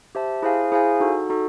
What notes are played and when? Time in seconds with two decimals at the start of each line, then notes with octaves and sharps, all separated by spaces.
0.15 G4 C5 E5 A5
0.42 E4 G#4 C5 F5 G#5
0.72 E4 G#4 C5 F5 G#5
1.00 D#4 F#4 A4
1.30 D#4 F#4 A4